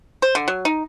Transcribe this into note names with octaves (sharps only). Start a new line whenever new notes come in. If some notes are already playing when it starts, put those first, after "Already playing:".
C5
D3
F#3
D#4